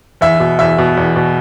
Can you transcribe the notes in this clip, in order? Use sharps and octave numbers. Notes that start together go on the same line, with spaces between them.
E2 E5
B2
E2 E5
B2
E2
B2